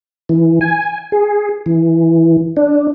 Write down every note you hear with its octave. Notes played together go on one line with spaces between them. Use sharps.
E3
G#5
G#4
E3
D4